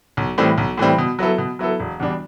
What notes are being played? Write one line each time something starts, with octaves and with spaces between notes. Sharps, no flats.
B1
A2 E3 G3 C4
B1
A2 E3 G3 C4
B2
F#3 B3 E4 A4
B2
F#3 B3 E4 A4
E1
E2 B2 G3 D4